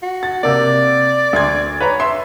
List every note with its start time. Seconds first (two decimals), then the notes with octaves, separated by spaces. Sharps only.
0.03 F#4
0.23 A6
0.43 C3 A#3 D5
1.33 D2 C6 G#6
1.81 B4 C#5 A#5
2.00 E5 C6